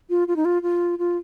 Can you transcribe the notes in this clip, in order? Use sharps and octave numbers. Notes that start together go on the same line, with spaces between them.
F4
F4
D#4
F4
F4
F4